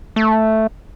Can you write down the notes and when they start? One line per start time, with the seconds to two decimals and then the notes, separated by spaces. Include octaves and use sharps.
0.16 A3